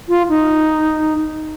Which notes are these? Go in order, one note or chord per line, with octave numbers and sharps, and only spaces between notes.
F4
D#4